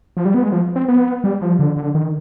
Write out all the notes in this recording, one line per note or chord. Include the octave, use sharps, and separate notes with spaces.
F3
G3
B3
G#3
F3
C4
B3
G3
F3
D3
D3
D#3